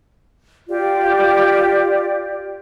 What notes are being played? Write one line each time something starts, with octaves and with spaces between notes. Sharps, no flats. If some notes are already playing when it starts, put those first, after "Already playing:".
F4 G4 D5